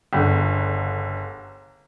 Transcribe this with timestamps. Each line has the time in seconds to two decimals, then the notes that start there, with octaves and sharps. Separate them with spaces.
0.13 G1 C#2 D3